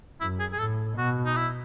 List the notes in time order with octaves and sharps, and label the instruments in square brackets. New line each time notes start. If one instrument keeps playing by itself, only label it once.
[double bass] F#2 [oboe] E4
[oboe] G#4
G#4
[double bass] A2 [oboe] A4
[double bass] B2 [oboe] F#4
[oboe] D#4
E4